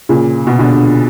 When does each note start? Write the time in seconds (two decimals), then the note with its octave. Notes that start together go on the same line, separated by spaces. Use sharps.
0.09 A#2 C#3
0.47 B2
0.59 B2 D3